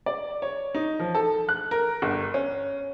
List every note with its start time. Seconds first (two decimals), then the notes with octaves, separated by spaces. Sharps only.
0.06 D5
0.42 C#5
0.75 D#4
1.00 F3
1.15 A4
1.49 F#6
1.71 A#4
2.02 G1
2.34 C#4